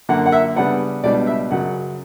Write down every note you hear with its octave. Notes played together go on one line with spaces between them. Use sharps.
F#2 D3 A#3 F#5
F#5
E5
C#3 G3 B3 D4 F#5
C#2 B2 G3 B3 D4 D5
E5
F#2 C#3 F#3 F#5